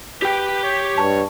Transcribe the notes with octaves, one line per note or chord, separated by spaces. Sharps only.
G4 B4 G5
C#5
G2 A5 C#6